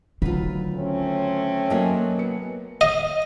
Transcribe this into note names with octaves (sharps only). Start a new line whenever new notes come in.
D2 D#3 F#3 F4 B4
A3 C4 C#4
F#3 A#3 F#4 D#5 G#5 A5
B3 C#7
D#5